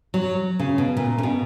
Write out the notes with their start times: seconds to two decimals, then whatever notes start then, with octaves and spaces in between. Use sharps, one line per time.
0.14 F#3
0.59 C#3
0.78 B2
0.97 A#2
1.18 C#3
1.23 B2